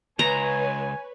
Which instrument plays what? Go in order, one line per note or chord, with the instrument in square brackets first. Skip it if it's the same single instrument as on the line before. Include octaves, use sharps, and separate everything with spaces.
[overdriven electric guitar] C#2 [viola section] B4 C#5 [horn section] G#5 [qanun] A#5